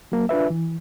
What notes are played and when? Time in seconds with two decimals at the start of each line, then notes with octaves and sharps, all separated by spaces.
0.12 F#3 A#3
0.29 D4 F4 B4 E5
0.50 E3